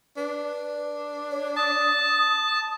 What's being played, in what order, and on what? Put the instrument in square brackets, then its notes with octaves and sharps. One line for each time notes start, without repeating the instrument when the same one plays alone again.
[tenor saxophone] D4 [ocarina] B4
[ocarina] C#5
[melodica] A5 [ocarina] D#6